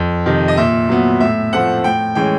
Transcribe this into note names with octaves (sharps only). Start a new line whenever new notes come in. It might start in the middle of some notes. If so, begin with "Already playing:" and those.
Already playing: F2
C3 D#3
D#5
A#2 E5
F#3 B3
A2 E5
F3 A3 C4 F#5
A2 G5
E3 G#3 C#4 G5